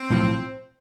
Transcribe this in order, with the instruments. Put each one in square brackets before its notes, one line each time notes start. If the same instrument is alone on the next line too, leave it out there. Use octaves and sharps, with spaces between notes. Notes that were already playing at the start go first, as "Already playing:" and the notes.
Already playing: [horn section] C4
[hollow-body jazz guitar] B1 A2 F3